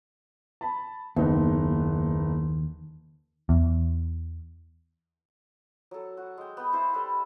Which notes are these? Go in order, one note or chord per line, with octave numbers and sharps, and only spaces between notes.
A5 B5
F#1 D#2 B3 D#4
E2
F#3 A4
F#4
G#3 G5
B3 G5
E4 C5 E5 A5
G3 A4 B4 B5